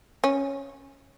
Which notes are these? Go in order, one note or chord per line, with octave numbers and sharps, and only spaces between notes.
C#4